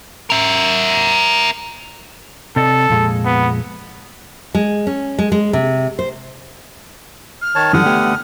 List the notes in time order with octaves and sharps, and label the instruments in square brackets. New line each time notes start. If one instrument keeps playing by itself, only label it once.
[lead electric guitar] A#4 E5
[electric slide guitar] C3 D5 D#5 [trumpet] A4
[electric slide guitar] F2 A#2 G#3
[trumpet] B3
[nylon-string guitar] G#3
C#4
G#3
G#3
C3
C5
[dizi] F6
[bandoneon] D#3 C#5 A5
[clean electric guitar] F#2 E3 G3 [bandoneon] D3 F#5 D#6
[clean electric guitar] A3 B3 G4